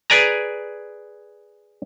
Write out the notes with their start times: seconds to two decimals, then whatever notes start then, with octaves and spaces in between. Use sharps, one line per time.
0.10 G#4 B4 D5 G#5 A#5